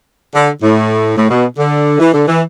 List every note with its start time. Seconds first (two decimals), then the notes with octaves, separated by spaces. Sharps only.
0.35 D3
0.62 A2
1.17 A2
1.30 B2
1.58 D3
1.99 E3
2.13 D3
2.27 E3